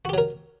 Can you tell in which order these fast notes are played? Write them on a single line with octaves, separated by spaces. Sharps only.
F#4 G4 F#3 A#4